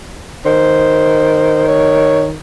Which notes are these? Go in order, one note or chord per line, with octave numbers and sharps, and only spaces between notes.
D#3 C5
C#5